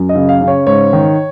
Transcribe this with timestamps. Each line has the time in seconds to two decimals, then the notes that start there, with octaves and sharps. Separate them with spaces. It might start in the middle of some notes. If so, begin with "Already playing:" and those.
Already playing: F#2
0.09 D#5
0.15 C#3
0.29 F5
0.41 C#3
0.48 C#5
0.67 G#2 C#5
0.93 D#3